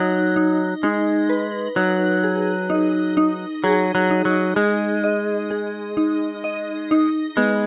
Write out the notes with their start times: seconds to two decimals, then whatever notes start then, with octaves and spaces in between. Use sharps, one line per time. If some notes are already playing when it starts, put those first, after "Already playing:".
Already playing: F#3 D#4
0.36 D#4
0.83 G#3 D#4
1.29 B4
1.76 F#3 D#4
2.24 G#4
2.70 D#4
3.17 D#4
3.64 F#3 G#4
3.95 F#3
4.10 D#4
4.25 F#3
4.56 G#3 G#4
5.04 D#5
5.50 G#4
5.97 D#4
6.44 D#5
6.91 D#4
7.37 G#3 B3